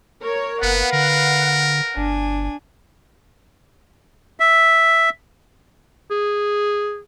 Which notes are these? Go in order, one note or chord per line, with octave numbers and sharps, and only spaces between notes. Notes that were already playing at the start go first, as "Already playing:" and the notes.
A#4 C#5
F#1 B3 B4 F5 F#5
D3 A#4
G1 D4 G#5
E5
G#4